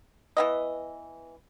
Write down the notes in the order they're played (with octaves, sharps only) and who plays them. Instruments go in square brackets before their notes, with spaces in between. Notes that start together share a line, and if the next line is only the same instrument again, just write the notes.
[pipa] E3 B3 D#5